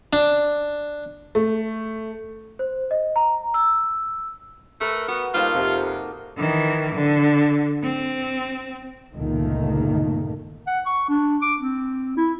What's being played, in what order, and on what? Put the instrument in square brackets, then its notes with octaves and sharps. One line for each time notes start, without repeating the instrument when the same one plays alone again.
[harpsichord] D4
[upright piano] A3
[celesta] C5
D#5
A#5
E6
[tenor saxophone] A3 [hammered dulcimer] A#4 B4
[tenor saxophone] B3 [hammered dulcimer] F#4
[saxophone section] G3 C5 [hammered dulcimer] A#3 D#4 A4 [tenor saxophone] F4
[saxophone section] F2 C3
[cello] D#3 E3
D3
C4
[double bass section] G1 C#2 A#2 D#3 A3 A#3
[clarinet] F#5
C#6
D4
D6
C4
E4